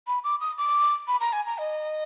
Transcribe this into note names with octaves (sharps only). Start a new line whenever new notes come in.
B5
D6
D#6
D6
B5
A#5
G#5
A#5
D#5